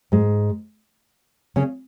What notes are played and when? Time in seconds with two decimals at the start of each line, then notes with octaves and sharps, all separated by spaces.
0.12 G#2 G#3
1.56 C#3 C#4